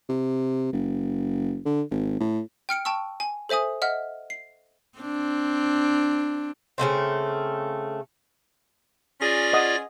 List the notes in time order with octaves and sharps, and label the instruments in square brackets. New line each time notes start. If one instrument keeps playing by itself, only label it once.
[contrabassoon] C3
F#1
D3
G#1
A2
[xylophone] G5 F6 C#7 D7
G5 A5 C#6 E6
G#5
A4 C5 E5 G#5 D#6
D#5 E5 F#5 F6
C7
[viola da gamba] C4 D4
[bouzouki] C#3 E3 A3 C4
[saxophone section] C#4 G#4 [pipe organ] F4 D5 A#6
[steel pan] D#5 F#5 D#6